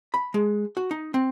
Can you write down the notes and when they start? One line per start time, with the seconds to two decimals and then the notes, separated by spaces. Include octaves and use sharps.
0.14 B5
0.34 G#3
0.77 F#4
0.91 D#4
1.14 C4